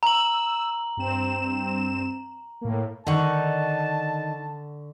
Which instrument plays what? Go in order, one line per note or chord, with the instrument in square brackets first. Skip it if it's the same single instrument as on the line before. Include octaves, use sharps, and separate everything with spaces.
[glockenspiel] A#5 F#7 [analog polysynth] E6
[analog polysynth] G2 C4 E7
A2 A#3
[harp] D3 F#5 C#6 [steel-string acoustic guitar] D#3 D#4 [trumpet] A5